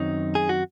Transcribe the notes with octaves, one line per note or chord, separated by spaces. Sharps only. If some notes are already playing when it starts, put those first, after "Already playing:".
Already playing: F#2 D#3 F#3 C4 D#4
G#4
F#4